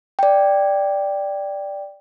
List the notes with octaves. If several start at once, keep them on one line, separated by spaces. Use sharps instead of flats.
D5 G5